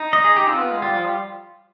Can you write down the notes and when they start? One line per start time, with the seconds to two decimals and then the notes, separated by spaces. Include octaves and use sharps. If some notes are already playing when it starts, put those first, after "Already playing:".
Already playing: D#4
0.13 D#5
0.24 G#4
0.36 G4
0.48 C4 F4
0.58 B3
0.71 G#3
0.82 G3 F4
0.94 F3
1.05 G3